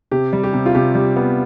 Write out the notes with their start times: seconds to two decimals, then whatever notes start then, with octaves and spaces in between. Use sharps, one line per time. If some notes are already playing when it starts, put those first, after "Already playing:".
0.11 C3 G4
0.33 G3
0.43 G4
0.53 C3
0.66 F4
0.75 C3 G4
0.95 G3
1.16 B3